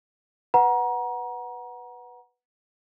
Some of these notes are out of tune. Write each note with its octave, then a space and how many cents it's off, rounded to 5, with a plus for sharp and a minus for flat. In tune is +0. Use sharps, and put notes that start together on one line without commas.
B4 +0 F#5 +0 A#5 +30